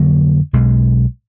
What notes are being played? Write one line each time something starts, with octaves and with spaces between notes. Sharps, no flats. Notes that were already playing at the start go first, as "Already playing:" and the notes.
Already playing: F2 D3 F#3 A#3
B1 B2 G#3